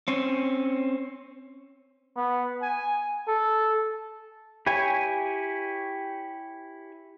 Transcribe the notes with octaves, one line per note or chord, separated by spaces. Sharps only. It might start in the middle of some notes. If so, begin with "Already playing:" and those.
C4 C#4
B3
G#5
A4
E4 G4 C#5 G#5